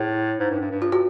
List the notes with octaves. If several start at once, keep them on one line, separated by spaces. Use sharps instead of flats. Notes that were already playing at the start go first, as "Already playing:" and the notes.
Already playing: A2 G#4
G#2
G2
G2
G2
F4
F#4